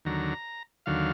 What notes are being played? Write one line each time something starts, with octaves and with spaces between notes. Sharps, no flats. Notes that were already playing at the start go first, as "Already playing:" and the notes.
D#2 D3 F#3 A#5
D#2 D3 F#3 F5